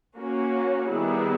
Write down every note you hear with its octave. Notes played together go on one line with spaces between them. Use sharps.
A#3 C#4 F#4
D#3 G3 B3 E4 G#4